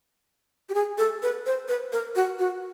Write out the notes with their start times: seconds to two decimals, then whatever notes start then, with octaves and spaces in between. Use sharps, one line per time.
0.69 G4
0.74 G#4
0.98 A4
1.23 B4
1.46 C5
1.68 B4
1.92 A#4
2.16 F#4
2.39 F#4